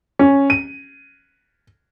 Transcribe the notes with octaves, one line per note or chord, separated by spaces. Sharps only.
C#4
D#7